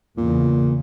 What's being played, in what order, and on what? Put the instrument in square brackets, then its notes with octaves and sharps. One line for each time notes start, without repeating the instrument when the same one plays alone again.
[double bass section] E2 C#3 [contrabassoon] A#2